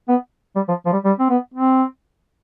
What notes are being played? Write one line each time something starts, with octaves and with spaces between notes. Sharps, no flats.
B3
G3
F3
F3
G3
G3
C4
B3
C4